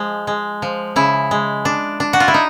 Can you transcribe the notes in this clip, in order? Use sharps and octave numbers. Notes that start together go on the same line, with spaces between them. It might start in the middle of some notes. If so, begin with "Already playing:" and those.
Already playing: F3 G#3
G#3
F3
C#3 E4
G#3
D4
D4
F#4
F4
E4
D#4